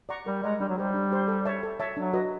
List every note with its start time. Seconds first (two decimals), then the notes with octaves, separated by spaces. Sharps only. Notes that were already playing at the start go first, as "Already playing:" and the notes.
0.09 D5 F#5 A#5 C#6
0.26 G3 A#4
0.43 G#3 D5 F#5 A#5 C#6
0.60 G3 D4
0.69 F#3
0.77 G3 G4 C5
0.94 D4
1.12 G4 C5
1.28 A4
1.45 C#5 E5 A5
1.63 A4
1.80 C#5 E5 A5
1.96 F#3 D4
2.13 F#4 B4 D#5